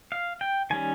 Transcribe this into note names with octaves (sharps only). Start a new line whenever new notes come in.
F5
G5
D#3 G3 C#4 G#5